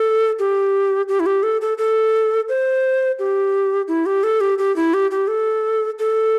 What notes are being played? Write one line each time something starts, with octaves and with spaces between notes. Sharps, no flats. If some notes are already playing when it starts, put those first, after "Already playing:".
Already playing: A4
G4
G4
E4
G4
A4
A4
A4
C5
G4
E4
G4
A4
G4
G4
E4
G4
G4
A4
A4